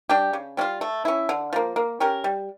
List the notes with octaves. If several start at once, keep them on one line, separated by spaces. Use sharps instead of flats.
G3 D4 G4
C#3
G3 C#4 F4
A3
C#4 E4
D3
F3 A#3
A#3
C#4 G4 A#4
G3